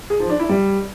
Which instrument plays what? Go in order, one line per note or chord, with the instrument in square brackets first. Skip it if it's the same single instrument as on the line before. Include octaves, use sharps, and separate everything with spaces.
[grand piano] G#4
F3
D4
E4
G3